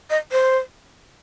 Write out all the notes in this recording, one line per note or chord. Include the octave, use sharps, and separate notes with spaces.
D#5
C5